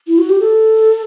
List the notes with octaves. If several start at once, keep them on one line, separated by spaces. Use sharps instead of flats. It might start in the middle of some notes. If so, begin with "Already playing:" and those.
E4
F#4
G4
A4